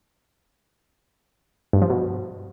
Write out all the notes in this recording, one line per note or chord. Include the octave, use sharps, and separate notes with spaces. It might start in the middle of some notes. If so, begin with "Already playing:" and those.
G2
F3
B2